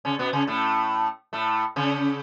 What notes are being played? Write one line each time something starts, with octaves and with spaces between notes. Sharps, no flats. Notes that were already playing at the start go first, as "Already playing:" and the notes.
C#3 C#4
B2 B3
C#3 C#4
A2 A3
A2 A3
C#3 C#4